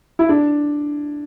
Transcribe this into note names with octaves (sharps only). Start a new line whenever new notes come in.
E4
D4